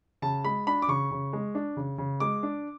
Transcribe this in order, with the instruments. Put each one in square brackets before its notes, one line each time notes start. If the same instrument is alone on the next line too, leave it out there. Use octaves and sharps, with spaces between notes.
[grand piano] C#3 A5
G#3 B5
D4 B5
D6
C#3 C#6
C#3
G#3
D4
C#3
C#3
G#3 D6
D4